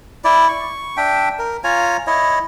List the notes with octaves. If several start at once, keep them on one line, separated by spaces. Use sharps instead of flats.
E4 D5
C#6
D4 E5 G5
A#4
F4 C#5 G#5 A#5
E4 C#5 D#5